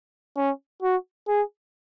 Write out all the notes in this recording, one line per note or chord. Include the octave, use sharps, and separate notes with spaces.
C#4
F#4
G#4